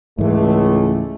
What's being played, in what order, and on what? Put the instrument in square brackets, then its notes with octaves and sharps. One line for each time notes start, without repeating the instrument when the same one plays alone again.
[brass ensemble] C#2 A3 [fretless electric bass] G#2 E3